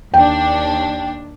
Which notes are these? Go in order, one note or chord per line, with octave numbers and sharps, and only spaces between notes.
D#2 D4 G5